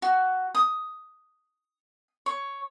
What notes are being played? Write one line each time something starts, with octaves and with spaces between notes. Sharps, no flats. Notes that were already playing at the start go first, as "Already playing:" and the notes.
F#4
D#6
C#5